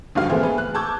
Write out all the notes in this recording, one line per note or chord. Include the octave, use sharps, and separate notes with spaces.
G1 G2 F3 F#4 F5 F6
A#2 E3 F3 G#3 A3 C4
A3 B3 G#4 A4 B4
F#6
A5 C#6 D6 E6 G6 G#6